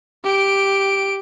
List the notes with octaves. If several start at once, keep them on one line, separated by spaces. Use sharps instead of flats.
G4 D7